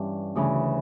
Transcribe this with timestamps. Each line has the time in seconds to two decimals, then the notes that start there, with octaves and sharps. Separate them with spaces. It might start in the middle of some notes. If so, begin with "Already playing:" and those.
Already playing: G2 E3 G3 C#4
0.35 D2 C#3 E3